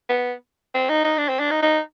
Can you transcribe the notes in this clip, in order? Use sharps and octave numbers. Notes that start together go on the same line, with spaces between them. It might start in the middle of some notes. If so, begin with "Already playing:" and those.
B3
C4
D#4
D#4
D4
C4
D4
D#4
D#4